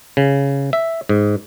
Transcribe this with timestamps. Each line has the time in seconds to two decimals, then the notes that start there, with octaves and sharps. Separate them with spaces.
0.17 C#3
0.73 E5
1.09 G#2